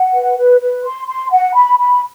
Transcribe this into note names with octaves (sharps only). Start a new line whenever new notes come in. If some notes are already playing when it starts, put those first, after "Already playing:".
Already playing: F#5
B4
B4
B4
C6
C6
F#5
B5
B5